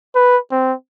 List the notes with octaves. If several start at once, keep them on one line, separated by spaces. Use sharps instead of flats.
B4
C4